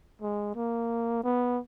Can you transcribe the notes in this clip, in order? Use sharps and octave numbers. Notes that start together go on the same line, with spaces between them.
G#3
A#3
B3